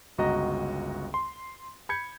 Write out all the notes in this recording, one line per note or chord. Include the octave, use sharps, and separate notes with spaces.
G1 C#2 F#4 D#5 A#5 A#6
C6
B5 G6 G#6 C#7